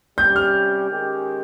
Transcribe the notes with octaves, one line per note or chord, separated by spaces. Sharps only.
C3 G3 C#4 G4 G6
F6
D#3 G#3 C#4 G4